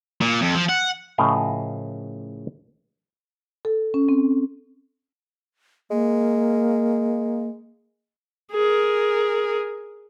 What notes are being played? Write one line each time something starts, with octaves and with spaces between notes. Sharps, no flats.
A#2
F2
F3
F#5
A2 C#3 F3 A#4 D#5 F5
A4
C#4
C4
G#3 A#3
G#4 A#4